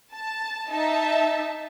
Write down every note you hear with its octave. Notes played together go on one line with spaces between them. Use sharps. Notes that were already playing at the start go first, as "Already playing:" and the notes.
A5
D#4 E5 A5